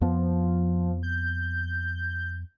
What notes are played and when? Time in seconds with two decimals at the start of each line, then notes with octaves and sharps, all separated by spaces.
0.01 F2 F3 B3
1.03 G6